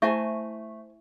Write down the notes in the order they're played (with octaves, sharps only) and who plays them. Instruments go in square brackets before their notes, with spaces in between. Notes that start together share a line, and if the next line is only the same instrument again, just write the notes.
[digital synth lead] A3 [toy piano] E4 E5 C#6 [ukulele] C5 G#5 A5